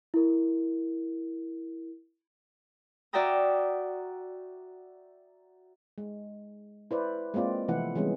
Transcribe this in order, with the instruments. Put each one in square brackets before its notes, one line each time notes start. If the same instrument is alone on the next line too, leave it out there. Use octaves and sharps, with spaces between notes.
[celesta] E4 A#4
[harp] F#4 D5 E5 G5 A#5 D#6
[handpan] G#3
E4 B4 C5 D5
G#3 A#3 C4 F4 D5
C3 E3 F3 A3 E4 F#5
E3 G3 G#3 B3 C#4 G#4